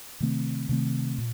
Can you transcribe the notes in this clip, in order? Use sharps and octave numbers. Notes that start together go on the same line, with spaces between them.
C3 D#3 A3 C4
C3 D#3 A3 C4
A#2